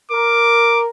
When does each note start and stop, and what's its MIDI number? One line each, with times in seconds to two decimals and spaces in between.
0.12 0.88 70
0.12 0.82 86